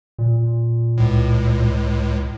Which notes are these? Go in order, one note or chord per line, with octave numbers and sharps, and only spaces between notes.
A#2
C#2 A2